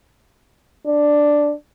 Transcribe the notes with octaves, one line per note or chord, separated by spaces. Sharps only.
D4